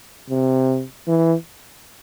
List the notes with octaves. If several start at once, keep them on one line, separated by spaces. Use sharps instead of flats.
C3
E3